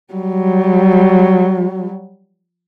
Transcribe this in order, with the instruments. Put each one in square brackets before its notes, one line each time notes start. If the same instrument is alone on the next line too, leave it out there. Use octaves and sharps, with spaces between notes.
[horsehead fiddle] F#3 G3